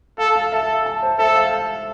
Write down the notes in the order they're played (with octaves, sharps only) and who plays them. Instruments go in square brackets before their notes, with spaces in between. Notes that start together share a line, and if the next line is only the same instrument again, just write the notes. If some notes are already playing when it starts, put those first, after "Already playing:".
[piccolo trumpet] A4 [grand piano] F5
[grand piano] F5
[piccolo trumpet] A4 [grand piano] E5
[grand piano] F5
A5
C5
[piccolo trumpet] A4 [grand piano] E5
[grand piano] F5